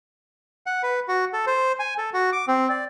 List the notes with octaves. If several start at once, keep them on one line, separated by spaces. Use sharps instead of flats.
F#5
B4
F#4
A4
C5
G#5
A4
F#4
D6
C4
D5